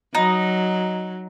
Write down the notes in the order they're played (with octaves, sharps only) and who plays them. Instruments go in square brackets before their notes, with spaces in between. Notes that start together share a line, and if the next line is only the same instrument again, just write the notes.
[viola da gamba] F#3 [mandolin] D#4